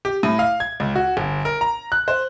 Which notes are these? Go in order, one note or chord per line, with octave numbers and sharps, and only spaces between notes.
G4
A2
F5
G#6
C#2
F#4
G1
A#4
A#5
F#6
C5